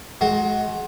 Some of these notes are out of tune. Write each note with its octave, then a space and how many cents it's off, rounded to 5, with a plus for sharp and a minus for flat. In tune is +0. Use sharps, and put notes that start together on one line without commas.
G#3 +30 F#4 +0